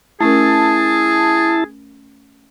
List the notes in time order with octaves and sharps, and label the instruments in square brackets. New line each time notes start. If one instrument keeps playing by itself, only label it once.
[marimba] A3 C#4 A#4 [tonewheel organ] E4 A5 [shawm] G#4